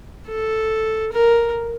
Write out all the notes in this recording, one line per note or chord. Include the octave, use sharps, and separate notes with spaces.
A4
A#4